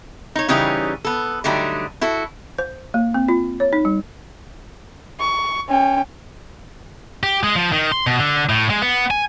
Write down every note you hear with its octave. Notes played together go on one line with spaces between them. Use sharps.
D#4 C#5
C#3 E3 G3 C#4 D#4
B3 A4
D3 F#3 G3 A3 D4 D#4
E4 F#4 A4
C5
A#3
C4
F4
C#5
D#4
G3
C#6
C#4 G5
G4
G#3
F3
D#3
C6
B2
D3
A2
G#3
B3
G#5